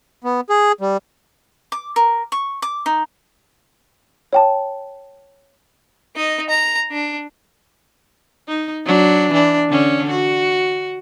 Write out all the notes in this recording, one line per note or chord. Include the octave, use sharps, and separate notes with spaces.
B3
G#4
G3
D6
A#4
C#6
D6
D#4
C#5 G5 A5
D#4 D#5
A#5
D4
D#4
F#3 D4
E3 D4
D3 C#4
F#4